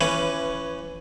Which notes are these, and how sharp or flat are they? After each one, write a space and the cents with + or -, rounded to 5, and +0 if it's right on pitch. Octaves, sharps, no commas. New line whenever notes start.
E3 +20 C#4 +0 B4 +10